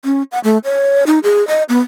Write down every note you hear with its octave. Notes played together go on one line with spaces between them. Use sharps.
C#4
F#5
A3
C#5
D#4
G#4
D#5
B3